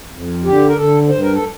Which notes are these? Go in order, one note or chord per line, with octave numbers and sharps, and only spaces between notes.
F2
D3 G4
A#4
D3 A4
G2 C5
A#4
A4